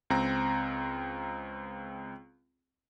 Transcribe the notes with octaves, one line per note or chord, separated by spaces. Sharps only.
C#2 C4 A#5